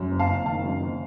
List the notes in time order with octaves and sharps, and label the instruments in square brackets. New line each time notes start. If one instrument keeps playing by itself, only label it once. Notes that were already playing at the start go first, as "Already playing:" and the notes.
Already playing: [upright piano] F#2
F#1
F5 A5
F#1
D#3 F5 A5
F#2
F#1